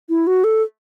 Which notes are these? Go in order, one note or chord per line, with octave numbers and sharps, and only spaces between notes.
E4
F#4
A4